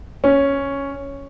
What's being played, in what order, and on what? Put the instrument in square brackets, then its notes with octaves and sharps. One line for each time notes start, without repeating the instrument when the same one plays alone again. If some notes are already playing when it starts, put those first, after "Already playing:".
[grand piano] C#4